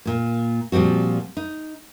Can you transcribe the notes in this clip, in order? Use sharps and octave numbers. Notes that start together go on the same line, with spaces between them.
A#2 A#3
A#2 F3 G3 C4 F#4
D#4